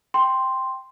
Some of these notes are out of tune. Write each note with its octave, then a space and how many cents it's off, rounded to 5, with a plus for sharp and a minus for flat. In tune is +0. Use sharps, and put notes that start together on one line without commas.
G5 +0 C6 +0